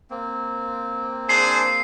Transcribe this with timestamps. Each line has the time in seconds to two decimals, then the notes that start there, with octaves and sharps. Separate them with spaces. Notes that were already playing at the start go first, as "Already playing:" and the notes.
0.10 A#3 C4
1.29 D4 G#4 C5 C7